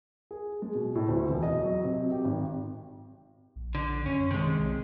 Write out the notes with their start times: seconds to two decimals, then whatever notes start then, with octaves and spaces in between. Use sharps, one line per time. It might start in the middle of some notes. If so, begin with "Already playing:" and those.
0.31 G#4
0.62 G#3
0.75 B2
0.95 A2
1.08 D2
1.29 E1
1.43 D#5
1.62 F#3
1.84 C3
2.12 G4
2.25 G#1
3.56 A#1
3.75 D3
4.06 F#2 C#4
4.31 C3 D#3 G#3
4.59 B1